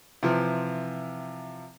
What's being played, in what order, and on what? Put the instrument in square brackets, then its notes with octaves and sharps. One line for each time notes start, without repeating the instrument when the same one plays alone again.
[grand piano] C3 E3 F3